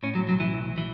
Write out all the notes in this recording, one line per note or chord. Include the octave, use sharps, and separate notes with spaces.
A2 C#4
F#3
B1 F#3
E3
B1
E3